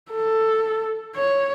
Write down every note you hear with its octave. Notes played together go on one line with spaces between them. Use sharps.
A4
C#5